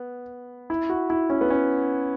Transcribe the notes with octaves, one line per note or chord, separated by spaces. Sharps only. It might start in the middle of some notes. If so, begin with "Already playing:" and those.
Already playing: B3
E4
F#4
E4
C#4
B3
C#4